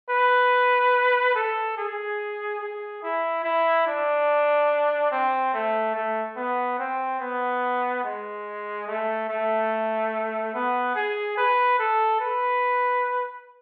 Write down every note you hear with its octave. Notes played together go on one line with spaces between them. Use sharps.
B4
A4
G#4
G#4
E4
E4
D4
C4
A3
A3
B3
C4
B3
G#3
A3
A3
B3
G#4
B4
A4
B4